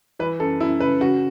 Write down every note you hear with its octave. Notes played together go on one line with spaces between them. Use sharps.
E3 B4
F#2 A4
F#2 E4
C#3 B4
C#3 F#4